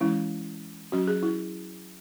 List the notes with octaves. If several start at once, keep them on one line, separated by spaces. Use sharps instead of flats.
E3 G#3 C#4 E4
F#3 C#4 F#4
G#4
E4